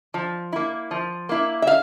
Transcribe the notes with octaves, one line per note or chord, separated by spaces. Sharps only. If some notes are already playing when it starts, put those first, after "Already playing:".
F3
A#3 E4
F3
A#3 E4
E5
F5